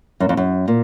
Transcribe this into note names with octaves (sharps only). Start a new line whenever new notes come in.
F#2
F2
F#2
A#2